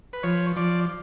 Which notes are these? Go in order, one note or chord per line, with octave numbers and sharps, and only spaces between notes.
B4
F3 C#5
F3 D5